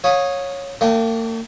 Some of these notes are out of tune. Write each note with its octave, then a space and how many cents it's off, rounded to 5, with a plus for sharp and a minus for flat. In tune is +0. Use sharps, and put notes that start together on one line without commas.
C#5 -5 F5 +35 D#6 +0
A#3 -45 D4 +0 G5 -30